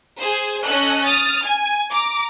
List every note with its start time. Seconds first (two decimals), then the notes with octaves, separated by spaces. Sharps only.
0.18 G#4 C5
0.64 C#4 A4 D#5 F#6
1.06 D#6 F6 A6
1.44 G#5
1.92 A#5 D6